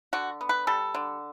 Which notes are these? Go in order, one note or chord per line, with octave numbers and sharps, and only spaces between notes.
D3 F#4
B3
B4
G3 A4
D3